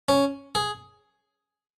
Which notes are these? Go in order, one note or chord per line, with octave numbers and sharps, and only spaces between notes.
C#4
G#4